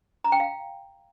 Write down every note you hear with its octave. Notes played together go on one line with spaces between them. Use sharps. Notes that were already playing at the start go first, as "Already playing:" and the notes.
A#5
G5
F5